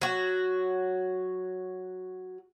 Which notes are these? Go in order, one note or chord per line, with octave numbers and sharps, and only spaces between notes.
F#3 F#4